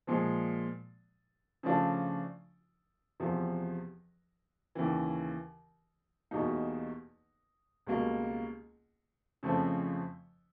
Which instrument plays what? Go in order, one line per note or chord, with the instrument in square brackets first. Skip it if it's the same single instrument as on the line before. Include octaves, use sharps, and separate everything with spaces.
[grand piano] A#2 F3 G#3
C#3 F3 A3 D4 F4
E2 C3 F3
D#2 C#3 E3
E2 B2 G3 A#3 D#4
C#2 B2 G3 A#3
F2 C#3 F3 A3 C4